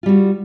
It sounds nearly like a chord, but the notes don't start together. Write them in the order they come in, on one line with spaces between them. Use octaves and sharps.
F4 G3 F#4